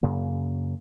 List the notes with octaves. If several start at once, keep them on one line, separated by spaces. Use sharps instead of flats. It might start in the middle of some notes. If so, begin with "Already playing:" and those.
F#2 C#3 A#3